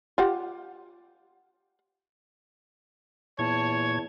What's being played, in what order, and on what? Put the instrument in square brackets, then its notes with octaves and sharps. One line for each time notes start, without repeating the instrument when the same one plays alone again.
[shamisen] F4 G4 F#5
[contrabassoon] E2 [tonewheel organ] A#2 G#6 [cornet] C#5 [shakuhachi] A5